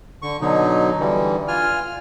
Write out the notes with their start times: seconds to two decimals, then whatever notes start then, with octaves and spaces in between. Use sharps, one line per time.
0.22 D3 C#6
0.41 B2 D3 F#3 D#4
1.00 D3 E3 G3
1.48 F4 G#5 F6